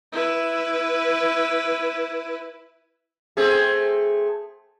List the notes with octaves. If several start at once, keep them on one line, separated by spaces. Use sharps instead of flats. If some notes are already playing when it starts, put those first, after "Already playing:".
E4 B4
A3 C4 G#4